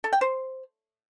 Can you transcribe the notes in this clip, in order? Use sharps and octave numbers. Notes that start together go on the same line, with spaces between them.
A4
G5
C5